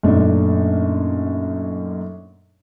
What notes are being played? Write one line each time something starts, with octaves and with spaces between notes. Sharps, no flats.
F#2 A#2 A3 D4 D#4